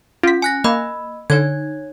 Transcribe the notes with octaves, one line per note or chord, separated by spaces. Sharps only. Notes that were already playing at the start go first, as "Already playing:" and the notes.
C#4 F4 B6
G#5 F#6 A#6
A#3 D#5 B5 E6
D3 D#4 C#5 G#6